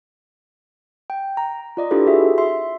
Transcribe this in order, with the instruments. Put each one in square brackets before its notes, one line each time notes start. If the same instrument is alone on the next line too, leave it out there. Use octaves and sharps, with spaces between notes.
[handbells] G5
A#5
F4 D5 D#5
D4 E4 F4 G4 A4 B4
F#4 G#4 E5
E5 C6